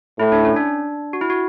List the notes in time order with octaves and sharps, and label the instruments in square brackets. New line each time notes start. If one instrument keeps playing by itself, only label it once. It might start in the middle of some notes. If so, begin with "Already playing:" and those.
[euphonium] A2 [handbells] E4
[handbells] D4
C#4
D4
F#4
E4
F#4